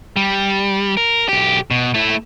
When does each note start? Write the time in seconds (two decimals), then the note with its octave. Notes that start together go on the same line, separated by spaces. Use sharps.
0.16 G3
0.97 A#4
1.29 B1 G4
1.71 B2
1.94 A3 E4